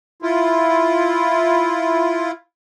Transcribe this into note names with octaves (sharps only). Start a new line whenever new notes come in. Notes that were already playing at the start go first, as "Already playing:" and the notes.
E4 F4